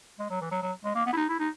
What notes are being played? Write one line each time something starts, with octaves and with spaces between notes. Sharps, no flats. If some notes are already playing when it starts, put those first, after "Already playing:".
G#3
F#3
E3
F#3
F#3
G#3
A#3
B3
E4
D#4
E4
D#4